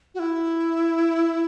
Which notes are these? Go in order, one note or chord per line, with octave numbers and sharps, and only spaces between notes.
F#4
E4